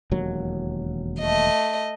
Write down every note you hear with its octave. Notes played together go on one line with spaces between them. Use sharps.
E1 D#2 F#3
A3 D#5